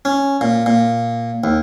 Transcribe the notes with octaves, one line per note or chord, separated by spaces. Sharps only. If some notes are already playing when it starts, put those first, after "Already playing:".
C#4
A#2
A#2
D#2